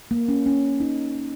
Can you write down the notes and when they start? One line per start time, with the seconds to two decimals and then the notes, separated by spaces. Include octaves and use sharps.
0.11 A#3
0.28 C#4
0.46 C#4
0.80 D#4